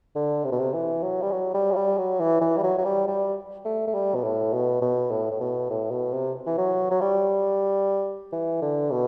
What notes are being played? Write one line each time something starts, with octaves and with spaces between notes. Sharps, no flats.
D3
C3
B2
C3
E3
F#3
G3
F#3
G3
F#3
G3
F#3
E3
E3
G3
F#3
F#3
G3
G3
A3
A3
G3
B2
A2
B2
B2
A2
A2
B2
A2
B2
C3
E3
F#3
F#3
G3
E3
D3
B2